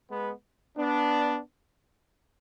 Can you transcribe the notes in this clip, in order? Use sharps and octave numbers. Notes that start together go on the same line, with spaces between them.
G#3 B3
B3 D4